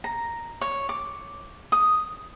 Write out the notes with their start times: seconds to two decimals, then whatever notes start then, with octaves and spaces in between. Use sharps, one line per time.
0.04 A#5
0.61 C#5
0.89 D6
1.72 D#6